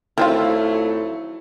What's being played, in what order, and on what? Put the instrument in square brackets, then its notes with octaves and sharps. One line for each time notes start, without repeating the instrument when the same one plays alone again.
[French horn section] F2 F#3 A3 [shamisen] D#3 C4 F4 [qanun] E4